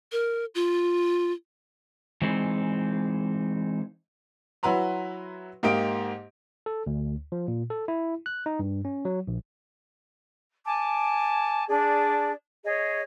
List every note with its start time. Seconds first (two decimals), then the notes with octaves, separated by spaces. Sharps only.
0.12 A#4
0.55 F4
2.22 E3 G#3 C4 D#4
4.63 F#3 E4 F#4 B4 A#5 C6
5.63 G#2 A#3 G4 D#5 D7
6.66 A4
6.87 D2
7.32 F3
7.48 A#2
7.70 A4
7.88 E4
8.26 F#6
8.46 D#4
8.59 G2
8.85 C#4
9.05 F#3
9.27 A#1
10.65 G#5 A5 D6
11.68 D4 G#4 D5
12.64 G#4 C#5 D#5